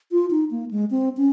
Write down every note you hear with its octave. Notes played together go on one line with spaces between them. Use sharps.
F4
D#4
A#3
G#3
C4
C#4